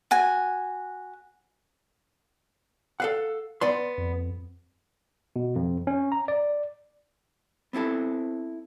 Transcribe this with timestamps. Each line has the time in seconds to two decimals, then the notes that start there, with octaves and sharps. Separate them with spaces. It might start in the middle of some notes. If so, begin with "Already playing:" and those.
0.11 F#4 G#5
3.00 A4 F5 F#5
3.61 B3 D5 C6
3.98 F2
5.36 B2
5.56 F2
5.87 C#4
6.12 A#5
6.28 D5
7.73 B3 C4 E4 A4